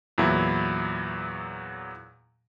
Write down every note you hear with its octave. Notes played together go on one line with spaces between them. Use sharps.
E2 A#2 F#3 E4